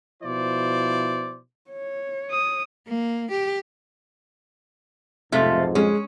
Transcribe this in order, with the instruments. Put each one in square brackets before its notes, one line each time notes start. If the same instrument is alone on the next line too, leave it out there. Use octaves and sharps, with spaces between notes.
[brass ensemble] B2 F3 E4 C5 D5
[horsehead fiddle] C#5
[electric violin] D#6
[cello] A#3
G4
[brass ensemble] B1 F2 G#2 [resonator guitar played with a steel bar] C3 F3 A3
[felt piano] G#3 [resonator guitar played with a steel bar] C#4